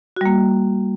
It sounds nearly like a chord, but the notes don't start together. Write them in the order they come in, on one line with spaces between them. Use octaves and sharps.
F#4 G3 A#3